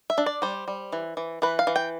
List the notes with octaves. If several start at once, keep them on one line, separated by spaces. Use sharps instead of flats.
E5
D4
D5
G3 C5
G3
E3
E3
E3 B4
F5
E3
G5